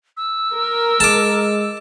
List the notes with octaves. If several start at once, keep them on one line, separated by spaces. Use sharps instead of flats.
E6
A#4
G#3 A5 D6